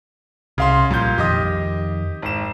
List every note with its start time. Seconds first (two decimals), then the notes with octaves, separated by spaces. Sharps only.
0.58 C2 C#3 F5 C6
0.91 A#1 A#2 G3 G6
1.18 F2 D#3 G4 D#5 D#6
2.22 G#1 E7